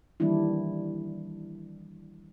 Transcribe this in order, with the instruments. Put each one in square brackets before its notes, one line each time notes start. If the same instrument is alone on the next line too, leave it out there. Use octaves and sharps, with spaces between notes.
[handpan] D#3 E3 G3 A#3 D4 E4